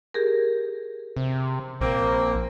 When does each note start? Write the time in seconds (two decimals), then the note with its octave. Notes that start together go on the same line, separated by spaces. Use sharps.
0.14 G4 G#4 A#4
1.17 C3
1.81 A#1 A#3 C4